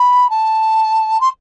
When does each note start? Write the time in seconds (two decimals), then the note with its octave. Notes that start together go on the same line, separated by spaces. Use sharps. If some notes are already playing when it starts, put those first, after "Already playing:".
Already playing: B5
0.30 A5
1.20 C6